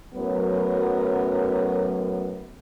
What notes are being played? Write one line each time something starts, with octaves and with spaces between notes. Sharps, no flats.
F#2 A2 F#3 B3 A#4